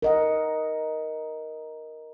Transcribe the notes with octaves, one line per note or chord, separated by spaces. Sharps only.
A#4 D#5 F#5